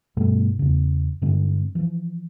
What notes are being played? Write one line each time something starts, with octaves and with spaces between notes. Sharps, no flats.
G2 B2 G3 A3
E2 C#3
G2 D3 G#3 C4
E3 F3